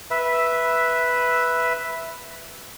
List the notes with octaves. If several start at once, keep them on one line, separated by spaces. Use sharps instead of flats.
B4 E5